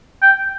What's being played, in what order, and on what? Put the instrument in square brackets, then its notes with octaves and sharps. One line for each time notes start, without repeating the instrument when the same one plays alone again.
[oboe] G5